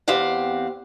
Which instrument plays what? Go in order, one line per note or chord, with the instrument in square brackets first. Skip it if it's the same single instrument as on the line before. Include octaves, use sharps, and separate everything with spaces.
[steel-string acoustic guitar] E2 C4 G4 F5 F#5